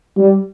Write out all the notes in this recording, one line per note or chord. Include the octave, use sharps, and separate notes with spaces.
G3